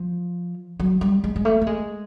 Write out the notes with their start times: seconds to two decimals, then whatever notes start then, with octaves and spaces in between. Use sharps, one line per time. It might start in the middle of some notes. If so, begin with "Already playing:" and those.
Already playing: F3
0.80 F#3
1.01 G3
1.24 G#3
1.36 G#3
1.45 A3
1.61 A3
1.67 G#3